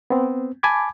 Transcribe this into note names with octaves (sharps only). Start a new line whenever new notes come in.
B3 C4
G#5 A5 B5 D6 G#6